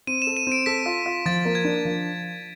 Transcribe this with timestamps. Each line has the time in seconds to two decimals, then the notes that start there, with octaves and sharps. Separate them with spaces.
0.07 C4 D#7
0.22 E7
0.27 A4
0.37 D#7
0.47 C4 D7
0.66 A4 B6
0.86 F4
1.06 F4
1.26 F3 A6
1.45 A#3
1.55 G#6
1.65 D4
1.85 F3